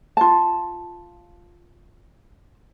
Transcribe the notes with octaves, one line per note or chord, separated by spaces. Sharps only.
F4 A5